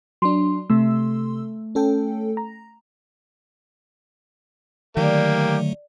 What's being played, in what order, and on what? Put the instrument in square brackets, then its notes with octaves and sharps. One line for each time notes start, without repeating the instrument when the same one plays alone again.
[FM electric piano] F#3 D4 [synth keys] C6
[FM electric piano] C3 C6 E6 [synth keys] A3
[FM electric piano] C#4 A4 G5
A#5
[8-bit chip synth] D3 F#3 A3 [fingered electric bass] D#3 [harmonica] A#3 G4 [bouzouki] D5